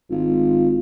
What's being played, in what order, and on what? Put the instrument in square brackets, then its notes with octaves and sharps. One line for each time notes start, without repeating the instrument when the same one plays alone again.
[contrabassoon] G#1 [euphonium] F4